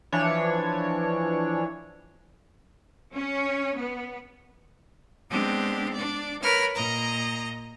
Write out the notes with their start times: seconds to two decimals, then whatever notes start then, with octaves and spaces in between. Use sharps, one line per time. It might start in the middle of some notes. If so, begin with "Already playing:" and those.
0.12 E3 F3 D4 C#5
3.13 C#4
3.76 B3
5.29 G#3 B3 C4 D4 G4
5.93 D4 D5
6.41 A#4 B4 C#5 B5 F6
6.75 A#2 D#5 A#5